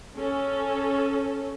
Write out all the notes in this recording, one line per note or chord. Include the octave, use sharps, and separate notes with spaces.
C#4 A4